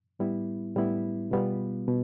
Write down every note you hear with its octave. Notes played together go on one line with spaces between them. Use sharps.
A2 G3 B3 E4
A2 G3 B3 E4
B2 G3 B3 F4
B2